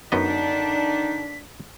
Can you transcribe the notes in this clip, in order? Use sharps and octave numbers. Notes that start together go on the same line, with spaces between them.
F#2 D3 D#3 B3 D4 D#4 D#5 B6